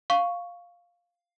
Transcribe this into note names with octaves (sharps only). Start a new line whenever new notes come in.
F5 C#6